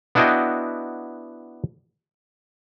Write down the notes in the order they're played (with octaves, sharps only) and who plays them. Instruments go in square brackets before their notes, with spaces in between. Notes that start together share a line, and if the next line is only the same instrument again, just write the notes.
[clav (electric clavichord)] B3 D4 E4 F#4 D#5 G5